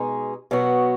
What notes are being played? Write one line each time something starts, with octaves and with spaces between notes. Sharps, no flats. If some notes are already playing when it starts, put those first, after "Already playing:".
Already playing: B2 G#3 D#4 G#4
B2 F#3 B3 F#4